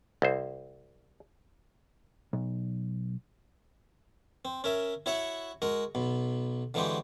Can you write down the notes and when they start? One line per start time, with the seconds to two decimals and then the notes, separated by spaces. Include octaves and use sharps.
0.22 C2 C5
2.33 B1
4.45 C4
4.64 C#4 A#4 E5
5.06 E4 F#4 C#5 E5 F#5 B5
5.62 G#3 F#4 A#4
5.95 B1 B2
6.74 D3 E3 G#3 C4 F#4 G4